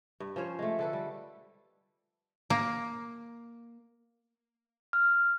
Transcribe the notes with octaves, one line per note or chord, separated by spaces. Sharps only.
G2
F3 C#4 C5 C#5
G#3 A3
D3 A4 B4
G3
A#3
F6